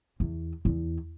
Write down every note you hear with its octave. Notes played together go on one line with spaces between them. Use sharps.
E2
E2